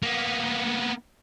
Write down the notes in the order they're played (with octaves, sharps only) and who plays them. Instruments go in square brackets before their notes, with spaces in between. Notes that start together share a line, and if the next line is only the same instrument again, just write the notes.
[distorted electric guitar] A#3 B3